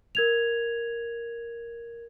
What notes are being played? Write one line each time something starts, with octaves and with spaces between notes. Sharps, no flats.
A#4 G#6 F7